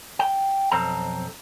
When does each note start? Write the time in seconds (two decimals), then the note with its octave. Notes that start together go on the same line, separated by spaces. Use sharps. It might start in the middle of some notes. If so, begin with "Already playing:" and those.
0.19 G5
0.72 B1 F2 C4 A4 A#5